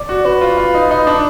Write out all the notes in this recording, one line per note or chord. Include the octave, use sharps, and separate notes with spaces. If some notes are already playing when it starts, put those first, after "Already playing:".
Already playing: D5
F#4
F#4 B4
F4
F4
D#4
D#4
D4